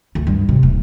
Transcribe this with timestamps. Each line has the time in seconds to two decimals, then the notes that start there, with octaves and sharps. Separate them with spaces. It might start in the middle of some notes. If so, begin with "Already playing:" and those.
0.15 D2
0.27 G2
0.49 C3
0.63 D#1